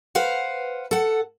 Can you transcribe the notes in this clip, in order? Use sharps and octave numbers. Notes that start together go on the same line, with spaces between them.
B4 C5 F5 F#5
A4 F#5